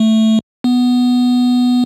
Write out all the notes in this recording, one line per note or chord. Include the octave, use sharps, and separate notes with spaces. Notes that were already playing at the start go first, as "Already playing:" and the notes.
Already playing: A3
B3